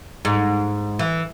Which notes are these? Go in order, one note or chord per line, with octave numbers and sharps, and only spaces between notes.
G#2
E3